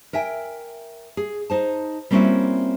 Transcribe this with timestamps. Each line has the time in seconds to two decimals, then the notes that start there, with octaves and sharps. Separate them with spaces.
0.13 A#4 E5 G5 G#5
1.17 G#4
1.50 D#4 C5 A5
2.11 G3 A#3 C4 C#4 E4 F#4